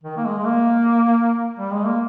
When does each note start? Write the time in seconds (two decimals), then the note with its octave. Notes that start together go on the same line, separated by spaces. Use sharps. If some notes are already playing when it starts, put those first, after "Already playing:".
0.04 D#3
0.17 A#3
0.25 G#3
0.39 G#3
0.46 A#3
1.59 G3
1.73 G#3
1.86 A#3